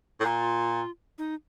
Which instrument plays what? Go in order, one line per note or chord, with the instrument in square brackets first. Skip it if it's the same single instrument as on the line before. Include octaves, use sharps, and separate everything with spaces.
[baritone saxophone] A2
[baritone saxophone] A#2 [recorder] F4
[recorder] D#4